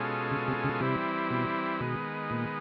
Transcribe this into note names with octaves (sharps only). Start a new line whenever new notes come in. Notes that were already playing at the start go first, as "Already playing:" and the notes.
Already playing: B2 G#3 C#4 F4 A4
C#3
C3
C#3
C3 E3 G3 C4 E4
B2
B2 D#3 G#3 B3
A#2